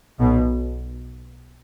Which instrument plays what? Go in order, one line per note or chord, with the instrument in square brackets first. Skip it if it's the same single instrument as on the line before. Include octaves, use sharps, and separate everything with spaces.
[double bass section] B1 B2